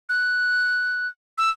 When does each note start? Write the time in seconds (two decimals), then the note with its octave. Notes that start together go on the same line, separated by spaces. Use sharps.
0.09 F#6
1.38 E6